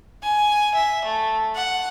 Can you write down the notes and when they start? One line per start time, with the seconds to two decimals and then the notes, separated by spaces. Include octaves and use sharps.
0.23 G#5
0.74 E5
1.04 A3
1.55 F#5